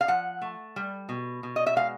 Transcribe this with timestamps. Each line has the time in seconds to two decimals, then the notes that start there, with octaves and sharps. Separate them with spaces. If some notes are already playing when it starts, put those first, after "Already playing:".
0.01 F5
0.08 F3 F#5
0.42 A3
0.76 G3
1.09 B2
1.43 B2
1.56 D#5
1.66 E5
1.76 G#3 F5